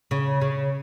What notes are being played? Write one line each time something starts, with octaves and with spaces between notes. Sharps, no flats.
C#3
C#3